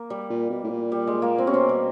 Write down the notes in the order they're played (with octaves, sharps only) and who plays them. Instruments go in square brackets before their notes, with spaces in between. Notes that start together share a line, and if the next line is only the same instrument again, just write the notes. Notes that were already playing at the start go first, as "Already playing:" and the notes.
Already playing: [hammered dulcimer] A#3
G3
[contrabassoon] A#2
B2
A2
A#2
[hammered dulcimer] G3
G#3
A#3
C4
[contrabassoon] C3 [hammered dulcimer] C#4
[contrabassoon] B2 [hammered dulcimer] C4
[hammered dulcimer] G3